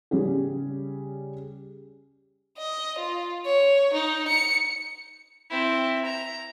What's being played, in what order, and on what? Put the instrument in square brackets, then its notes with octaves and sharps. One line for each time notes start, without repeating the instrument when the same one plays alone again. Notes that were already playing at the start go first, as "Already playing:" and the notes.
[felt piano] C#3 G3 C#4 G4 G#4
[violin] D#5
F4
C#5
D#4
C#7
[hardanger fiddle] C4 E4
A#5